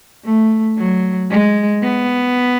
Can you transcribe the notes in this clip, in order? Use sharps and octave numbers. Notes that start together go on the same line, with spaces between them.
A3
F#3
G#3
B3